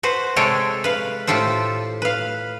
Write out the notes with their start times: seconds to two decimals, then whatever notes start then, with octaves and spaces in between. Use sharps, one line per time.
0.03 F#4 B4 C5
0.36 C3 G#3 A4 C#5 G5
0.84 B4 F5
1.27 A2 F4 G4 A4 C5
2.02 B4 F5